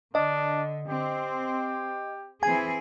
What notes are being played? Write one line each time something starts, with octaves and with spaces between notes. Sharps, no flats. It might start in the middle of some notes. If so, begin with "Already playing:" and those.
D3 D4 D#5
C4 G4
E3 C4 G#4 G#5